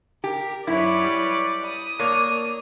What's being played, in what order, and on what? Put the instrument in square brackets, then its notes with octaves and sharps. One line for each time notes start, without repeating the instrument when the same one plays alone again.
[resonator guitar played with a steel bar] G4 [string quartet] A#4
[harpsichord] F#2 [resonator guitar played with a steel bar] E4 [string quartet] B4 C#5 D5
[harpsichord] G3
[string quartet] D#6
[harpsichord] A#3 D4 [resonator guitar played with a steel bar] A#4 C#5